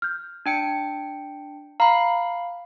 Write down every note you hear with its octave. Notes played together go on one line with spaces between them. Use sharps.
F6 G6
D4 G5 C#7
F5 A#5 B5